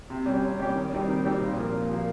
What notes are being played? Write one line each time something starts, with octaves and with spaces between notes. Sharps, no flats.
C3
G3 C#4 G4
C3
G3 C#4 G4
D#3
G3 C4 D#4 G4
D#3
G3 C4 D#4 G4
A#2
F3 A#3
A#2
F3 A#3